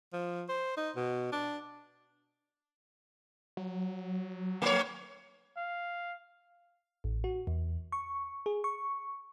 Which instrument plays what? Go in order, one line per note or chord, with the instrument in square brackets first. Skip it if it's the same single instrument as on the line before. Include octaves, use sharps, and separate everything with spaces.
[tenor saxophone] F3
C5
D#4
B2
D4
[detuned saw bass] F#3
[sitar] A3 C#5
[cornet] F5
[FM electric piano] A1
F#4
E2
C#6
G#4
C#6